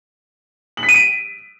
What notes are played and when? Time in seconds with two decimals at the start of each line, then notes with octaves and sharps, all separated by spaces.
0.77 F#7
0.83 B6
0.89 D#7
0.94 D7